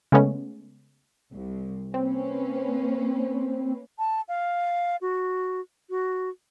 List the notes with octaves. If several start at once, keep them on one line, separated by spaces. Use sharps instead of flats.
C#3 G#3 A3 B3 C#4
C2
A#3 C4 C#4 B4
A5
F5
F#4
F#4